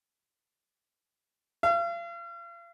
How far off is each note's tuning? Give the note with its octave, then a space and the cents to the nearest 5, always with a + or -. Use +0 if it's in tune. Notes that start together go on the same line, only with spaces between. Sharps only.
F5 -40